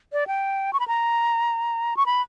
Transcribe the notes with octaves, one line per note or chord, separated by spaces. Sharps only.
D5
G5
C#6
B5
A#5
C#6
B5